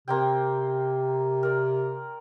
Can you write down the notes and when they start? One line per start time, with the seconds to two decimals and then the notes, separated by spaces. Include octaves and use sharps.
0.08 C3 A#3 C4 G5
1.43 A#4 D5